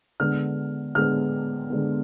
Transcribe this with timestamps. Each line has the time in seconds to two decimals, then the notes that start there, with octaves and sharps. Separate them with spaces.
0.20 D3 G#3 B3 F6
0.95 D3 G#3 B3 F6
1.70 D3 G#3 B3